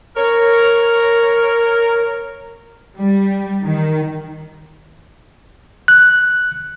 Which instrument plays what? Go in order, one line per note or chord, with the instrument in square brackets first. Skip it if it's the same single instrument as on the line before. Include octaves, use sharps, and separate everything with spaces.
[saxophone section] A#4 C#5
[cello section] G3
D#3
[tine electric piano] F#6